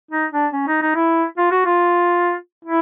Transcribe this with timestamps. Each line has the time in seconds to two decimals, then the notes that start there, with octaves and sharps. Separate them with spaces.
0.11 D#4
0.32 D4
0.53 C#4
0.67 D#4
0.82 D#4
0.95 E4
1.38 F4
1.51 F#4
1.66 F4
2.65 E4